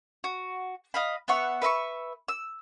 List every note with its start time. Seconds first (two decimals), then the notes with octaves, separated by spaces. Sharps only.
0.24 F#4
0.94 D#5 F5 B5
1.28 B3 E5 F#5 C#6
1.62 B4 E5 B5 C#6
2.28 E6